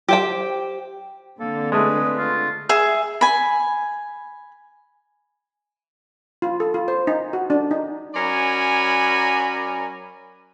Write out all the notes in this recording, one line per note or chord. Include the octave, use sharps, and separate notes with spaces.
G4 C5 G5
D3 A#3 C4 A4
G#3 A3 B4 D#6
F4
G#4 E5
G#5 B5
F4
A4
F4
C5
D#4
F#4
D4
D#4
F#3 C#4 A#4 D5 G#5 B5